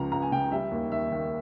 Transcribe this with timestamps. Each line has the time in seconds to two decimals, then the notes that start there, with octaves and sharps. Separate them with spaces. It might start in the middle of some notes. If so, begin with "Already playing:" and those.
Already playing: C#2 C#3 F3 A#5
0.12 C#2 A#5
0.22 G#5
0.32 C#3 G5
0.52 G3 E5
0.72 D#2
0.91 D#3 E5
1.11 D#3